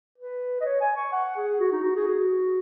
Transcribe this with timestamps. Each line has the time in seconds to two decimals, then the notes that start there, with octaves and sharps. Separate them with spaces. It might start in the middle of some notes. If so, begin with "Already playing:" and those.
0.18 B4
0.61 D#5
0.65 C#5
0.81 G#5
0.96 C#6
1.13 F#5
1.36 G#4
1.60 F#4
1.72 D#4
1.83 F#4
1.96 G#4
2.07 F#4